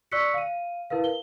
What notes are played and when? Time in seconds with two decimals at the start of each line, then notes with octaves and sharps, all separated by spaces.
0.12 D5 C#6 E6 F#6 B6 C#7
0.34 F5 D#7
0.90 E4 A#4 B4 F5
1.04 G7